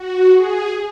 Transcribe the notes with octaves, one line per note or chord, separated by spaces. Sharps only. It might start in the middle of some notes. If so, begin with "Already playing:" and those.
Already playing: F#4
G#4